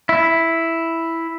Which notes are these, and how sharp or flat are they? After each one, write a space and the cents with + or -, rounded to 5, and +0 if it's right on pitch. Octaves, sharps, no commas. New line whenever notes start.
E4 +0